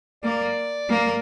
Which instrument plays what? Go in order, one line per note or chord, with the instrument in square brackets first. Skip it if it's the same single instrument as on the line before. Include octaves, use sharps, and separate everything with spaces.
[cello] A#3 [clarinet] D5
[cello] A#3